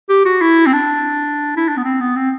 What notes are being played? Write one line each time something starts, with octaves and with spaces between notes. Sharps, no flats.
G4
F#4
E4
C4
D4
E4
D4
B3
C4
B3
C4